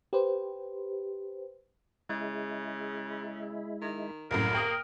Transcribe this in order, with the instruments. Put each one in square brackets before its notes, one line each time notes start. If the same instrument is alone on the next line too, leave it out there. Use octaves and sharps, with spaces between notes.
[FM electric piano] G4 B4 C5
[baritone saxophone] C#3 [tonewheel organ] G#3 E4
[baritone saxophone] D#3
[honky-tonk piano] C2 F#2 A2 [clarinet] A#4 [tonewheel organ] F5
[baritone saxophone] A#3 [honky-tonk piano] G5 D#6 F6